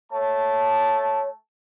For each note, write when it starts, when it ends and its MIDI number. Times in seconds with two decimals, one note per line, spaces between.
0.12 1.31 57
0.12 1.29 73
0.12 1.31 81